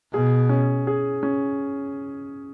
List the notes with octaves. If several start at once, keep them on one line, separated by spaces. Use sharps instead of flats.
B2 G#4
C#4
G#4
C#4